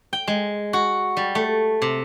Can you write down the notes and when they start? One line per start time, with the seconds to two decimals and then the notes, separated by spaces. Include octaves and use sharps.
0.13 G5
0.28 G#3
0.73 F#4
1.17 G3
1.35 A3
1.82 C3